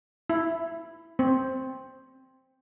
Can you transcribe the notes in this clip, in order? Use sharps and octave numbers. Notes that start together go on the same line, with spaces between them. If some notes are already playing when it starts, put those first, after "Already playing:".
E4
C4